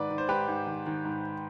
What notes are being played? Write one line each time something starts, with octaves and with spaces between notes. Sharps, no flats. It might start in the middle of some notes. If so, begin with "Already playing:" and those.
Already playing: G#2 D#3 B4 D5
D#3
C5
G#2 G4 B4
G#2
D#3
D#3
G#2